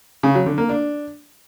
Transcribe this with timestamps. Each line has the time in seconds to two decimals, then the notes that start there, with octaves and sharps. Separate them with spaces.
0.23 C#3
0.35 F#3
0.46 D3
0.58 A#3
0.69 D4